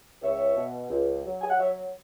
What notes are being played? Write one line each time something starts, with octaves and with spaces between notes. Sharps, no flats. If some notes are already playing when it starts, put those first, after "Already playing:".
C#2 C#5 E5
B2
C#2
F#3
G#5
F#5
F#3 C#5 E5